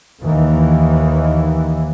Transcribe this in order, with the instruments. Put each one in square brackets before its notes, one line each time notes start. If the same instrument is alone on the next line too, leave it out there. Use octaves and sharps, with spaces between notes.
[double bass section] D#2 D#3 E3